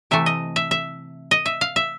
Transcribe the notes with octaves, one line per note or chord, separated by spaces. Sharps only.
C3 E3 A3 E5
D#5
E5
E5
D#5
E5
F5
E5